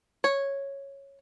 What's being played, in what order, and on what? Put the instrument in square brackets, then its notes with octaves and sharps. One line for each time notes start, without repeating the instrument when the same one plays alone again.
[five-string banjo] C#5